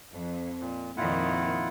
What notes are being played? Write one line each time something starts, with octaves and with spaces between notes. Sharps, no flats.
F2
A#2
F2 A#2 D#3 E4 F4 F#5